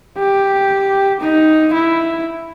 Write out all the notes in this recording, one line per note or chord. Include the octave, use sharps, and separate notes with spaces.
G4
D#4
E4